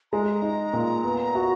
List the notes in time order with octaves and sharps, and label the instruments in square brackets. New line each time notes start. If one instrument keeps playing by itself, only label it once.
[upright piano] G#3 [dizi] A#5
[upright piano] D#4
A#2
B3
F#4